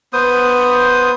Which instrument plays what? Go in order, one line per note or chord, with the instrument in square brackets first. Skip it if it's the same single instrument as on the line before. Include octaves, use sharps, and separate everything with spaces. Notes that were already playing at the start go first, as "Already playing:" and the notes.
[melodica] B3 C5 D#6